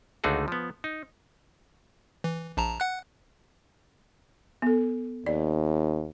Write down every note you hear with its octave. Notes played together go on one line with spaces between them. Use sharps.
C#2 D3 A3 D#4 F#4 G#4
F3 B3
D#4
E3
A#1 A5 A#5
F#5 F#6
B3 A4
D#2 D5